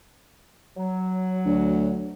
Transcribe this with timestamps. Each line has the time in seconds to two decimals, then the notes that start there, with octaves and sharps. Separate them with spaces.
0.77 F#3
1.45 D2